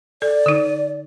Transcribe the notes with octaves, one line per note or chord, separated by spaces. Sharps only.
A4 D5
D3 D#4